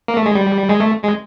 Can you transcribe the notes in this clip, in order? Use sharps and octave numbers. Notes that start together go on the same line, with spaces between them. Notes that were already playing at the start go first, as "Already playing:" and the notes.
A#3
A3
G#3
G3
G#3
A3
G#3